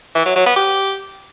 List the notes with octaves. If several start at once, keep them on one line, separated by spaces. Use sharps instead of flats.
E3
F#3
F#3
B3
G4